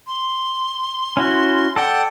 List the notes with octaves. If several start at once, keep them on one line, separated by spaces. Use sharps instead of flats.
C6
C#4 E4 F#4
A4 D5 F#5 G5